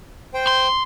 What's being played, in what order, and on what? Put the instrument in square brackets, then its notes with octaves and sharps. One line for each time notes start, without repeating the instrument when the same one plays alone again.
[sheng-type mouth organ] C5 G5
[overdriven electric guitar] C6